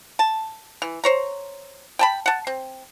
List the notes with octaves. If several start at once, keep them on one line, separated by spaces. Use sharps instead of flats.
A5
E3
C5 C#5 A#5
G5 A5 B5
F#5 A5
C4